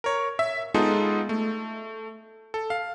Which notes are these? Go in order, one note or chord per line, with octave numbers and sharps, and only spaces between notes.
A#4 C#5
E5
G#3 B3 D#4 F4 G#4 A4
A3
A4
F5